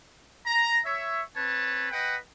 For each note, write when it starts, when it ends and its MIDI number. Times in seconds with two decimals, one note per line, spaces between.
0.47 0.80 82
0.85 1.22 73
0.85 1.22 76
1.37 1.90 60
1.37 1.90 71
1.37 1.90 73
1.37 1.90 81
1.92 2.17 71
1.92 2.17 75
1.92 2.17 78
1.92 2.17 79